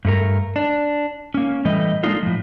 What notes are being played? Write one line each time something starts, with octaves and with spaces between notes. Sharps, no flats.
G2 A3 A#4
D4
A#3 C#4
A2 E3 G3 A3 D#5
G#3 A#3 D4 D#4 F4 A4
A2 F3